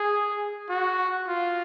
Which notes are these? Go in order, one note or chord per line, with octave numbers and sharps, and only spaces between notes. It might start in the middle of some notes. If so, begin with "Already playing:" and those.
Already playing: G#4
F#4
F4